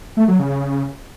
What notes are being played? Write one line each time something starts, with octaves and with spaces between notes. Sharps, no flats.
A3
F#3
C#3